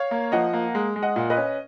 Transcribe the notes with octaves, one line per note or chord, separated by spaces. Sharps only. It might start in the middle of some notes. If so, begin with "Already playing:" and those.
Already playing: C#5 F5
A#3
F3 D#5 F#5
A#3
G#3
G#3
D#5 F#5
A#2
B4 D#5
C#4